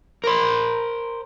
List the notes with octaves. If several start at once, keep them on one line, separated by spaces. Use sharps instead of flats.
A#4 C5